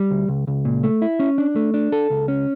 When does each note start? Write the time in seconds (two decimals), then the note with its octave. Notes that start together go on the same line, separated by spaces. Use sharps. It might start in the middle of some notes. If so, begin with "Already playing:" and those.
Already playing: G3
0.11 D2
0.28 C#2
0.47 C#2
0.65 A#2
0.83 A3
1.02 E4
1.20 C#4
1.38 D4
1.56 A3
1.74 D4
1.92 A4
2.10 C#2
2.28 C#4